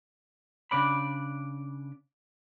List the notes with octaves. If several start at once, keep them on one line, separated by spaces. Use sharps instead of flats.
C#3 D4 D5 B5